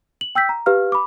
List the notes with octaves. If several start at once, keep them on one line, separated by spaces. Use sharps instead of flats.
F#7
G5 E6 G6 B6
A#5
G4 B4 F5 F6
B5 D6